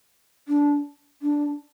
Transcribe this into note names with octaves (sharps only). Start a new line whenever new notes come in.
D4
D4